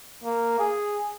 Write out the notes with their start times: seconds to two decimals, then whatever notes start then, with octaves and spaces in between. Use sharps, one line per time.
0.24 A#3
0.59 G#4